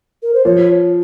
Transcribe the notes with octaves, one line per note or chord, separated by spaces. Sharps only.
A#4
C5
F3 C#5